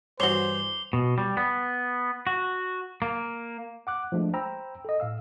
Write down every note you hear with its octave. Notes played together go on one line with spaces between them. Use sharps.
G2 E3 F#4 C5 C#5 D6 C7 G7
B2
G3
B3
F#4
A#3
F#5 D6 F#6
F3 G#3 A3 D4
C5 G5 A#5 B5 E6
A4 D#5
A2 F5 E6